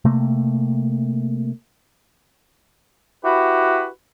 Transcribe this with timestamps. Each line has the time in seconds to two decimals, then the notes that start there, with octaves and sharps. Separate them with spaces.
0.05 C3 A3 A#3
3.25 E4 F#4 G4 B4